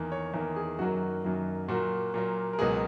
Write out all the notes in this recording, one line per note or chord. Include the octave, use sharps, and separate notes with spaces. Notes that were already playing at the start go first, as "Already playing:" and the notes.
Already playing: E2 D#3 A#3
C#5
E2 D#3 A#3 A#4
G#4
F#2 D#3 F#3 A#3 F#4
F#2 D#3 F#3 A#3
A#2 F#3 A#3 F#4
A#2 F#3 A#3
A#4
C#2 B2 F#3 A#3 G#4